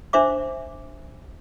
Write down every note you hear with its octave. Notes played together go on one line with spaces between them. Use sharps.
D4 C5 E5 D6